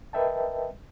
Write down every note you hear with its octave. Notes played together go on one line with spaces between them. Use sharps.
A#4 B4 D#5 E5 G5 A5